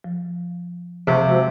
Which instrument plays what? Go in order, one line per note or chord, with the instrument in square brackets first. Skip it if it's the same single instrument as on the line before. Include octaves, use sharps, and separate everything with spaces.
[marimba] F3
[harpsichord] C3 [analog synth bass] F3 [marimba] C5 A5 C#6
[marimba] G#3 F#4 E6